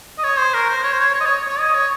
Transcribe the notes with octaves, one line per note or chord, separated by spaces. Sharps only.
D#5
C#5
C5
A#4
C5
C#5
C5
C#5
C#5
D#5
C#5
C#5
D#5
C#5